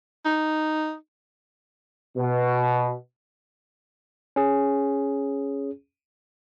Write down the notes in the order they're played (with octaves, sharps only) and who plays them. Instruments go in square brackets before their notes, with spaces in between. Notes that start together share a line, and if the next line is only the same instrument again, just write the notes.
[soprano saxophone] D#4
[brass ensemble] B2
[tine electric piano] C#4 G#4